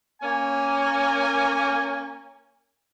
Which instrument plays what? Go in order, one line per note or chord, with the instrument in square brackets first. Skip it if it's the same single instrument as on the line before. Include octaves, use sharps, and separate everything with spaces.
[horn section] A#3 C#4 G#5